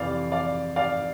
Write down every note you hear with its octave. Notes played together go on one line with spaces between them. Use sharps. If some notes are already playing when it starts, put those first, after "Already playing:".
Already playing: F2 C3 E3 D5 F5
D5 F5
D5 F5